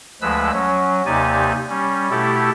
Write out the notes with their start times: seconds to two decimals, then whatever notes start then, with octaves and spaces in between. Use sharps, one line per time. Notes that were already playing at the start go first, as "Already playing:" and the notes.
0.22 D2 F3 G#3 B4 E6
0.53 F#3 C#4
1.06 D#2 C3 D#4 G4 D5 G#5
1.69 G3 C#4
2.10 B2 A3 E4 G4 A4